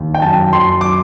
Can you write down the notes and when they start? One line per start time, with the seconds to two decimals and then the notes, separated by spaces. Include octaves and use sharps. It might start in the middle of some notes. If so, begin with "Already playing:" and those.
Already playing: D#2
0.14 G5
0.22 F#2 A5
0.52 F#2 C6
0.81 D6